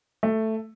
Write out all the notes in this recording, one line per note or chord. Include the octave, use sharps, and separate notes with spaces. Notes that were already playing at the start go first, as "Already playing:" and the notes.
A3